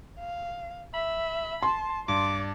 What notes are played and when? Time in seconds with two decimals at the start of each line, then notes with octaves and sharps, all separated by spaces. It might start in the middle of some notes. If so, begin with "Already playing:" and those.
0.19 F5
0.94 E5 B5
1.63 A5 C6
2.08 G2 D5 D6